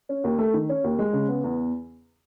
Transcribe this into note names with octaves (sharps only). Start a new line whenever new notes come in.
C#4
D#2
A3
D#3
C#4
D#2
G#3
C#3
B3
E2